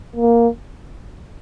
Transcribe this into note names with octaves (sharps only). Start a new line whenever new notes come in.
A#3